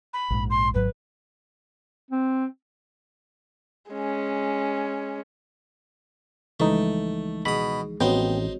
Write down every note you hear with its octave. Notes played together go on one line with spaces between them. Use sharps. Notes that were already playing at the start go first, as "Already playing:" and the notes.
B5
A#1 G#2
C6
G#1 G#2 F#3 B4
C4
G#3 C#4
C#2 E3 F3 G#3 A3 D#4
B2 G#4 B5 D#6
A1 B3 C4 D#4 F#4 C5 C#5 G5